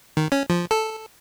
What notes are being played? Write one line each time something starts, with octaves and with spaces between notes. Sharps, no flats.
D#3
C#4
F3
A4